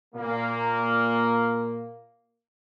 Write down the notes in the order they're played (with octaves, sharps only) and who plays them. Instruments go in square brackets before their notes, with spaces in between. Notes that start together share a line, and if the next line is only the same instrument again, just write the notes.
[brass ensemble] A#2 A#3